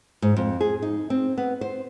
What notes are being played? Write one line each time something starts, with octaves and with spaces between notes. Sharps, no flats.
G#2
F2
G#4
D#4
C4
B3
C5